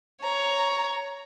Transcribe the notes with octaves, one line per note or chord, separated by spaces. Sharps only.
C#5 A#5